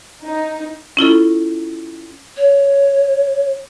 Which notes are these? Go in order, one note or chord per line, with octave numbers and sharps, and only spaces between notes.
D#4
C#4 E4 F4 A4
C#5